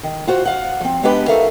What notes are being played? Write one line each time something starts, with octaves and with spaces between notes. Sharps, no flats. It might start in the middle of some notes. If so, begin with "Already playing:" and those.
D#3
F4 F#4 C5
F5 F#5
F3 C4
G#3 B3 D4 G4 B4 G5
D#4 F#4 A4 A#4 E5 F5